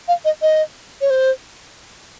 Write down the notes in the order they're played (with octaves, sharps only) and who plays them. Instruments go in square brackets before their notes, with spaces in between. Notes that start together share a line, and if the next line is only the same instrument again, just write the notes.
[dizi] F5
D#5
D#5
C#5
C5